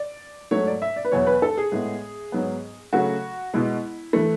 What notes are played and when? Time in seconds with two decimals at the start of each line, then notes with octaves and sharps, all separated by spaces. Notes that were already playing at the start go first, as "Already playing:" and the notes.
Already playing: D5
0.51 G#2 F#3 A3 C#5
0.67 D5
0.82 E5
0.96 D5
1.05 B4
1.12 E2 B2 F#3 B3 C#5
1.27 B4
1.42 A4
1.58 G#4
1.72 A2 G#3 B3
2.32 G#2 F#3 B3
2.93 C#3 F#3 A3 F#4
3.54 B2 G#3 B3 E4
4.13 E3 A3